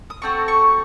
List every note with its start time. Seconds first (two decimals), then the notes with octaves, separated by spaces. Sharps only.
0.10 D#6
0.22 A3 C4 F#4 A4 C#6
0.48 C#6